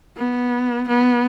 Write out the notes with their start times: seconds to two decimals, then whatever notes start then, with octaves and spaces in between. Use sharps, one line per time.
0.17 B3
0.88 B3